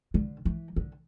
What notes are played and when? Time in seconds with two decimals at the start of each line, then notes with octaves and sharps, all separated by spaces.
0.14 D3
0.45 E3
0.76 D3